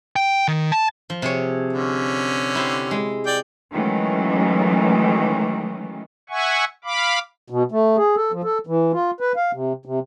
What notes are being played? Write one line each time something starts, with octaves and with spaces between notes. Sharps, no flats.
G5
D#3
A5
F3
C3 G#4 C#5
D3 C#4
E4 G4 C5
G#3
D5 G5
D#3 E3 F#3 G#3 A3 C#4
E5 F#5 G#5 C#6
F5 B5 D6
B2
A3
G#4
A4
F3
A4
E3
F4
B4
F5
C3
C3